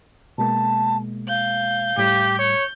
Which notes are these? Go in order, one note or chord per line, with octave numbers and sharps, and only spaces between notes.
B2 G#3 A#3 A5
F5 G6
A2 G3 G4
C#5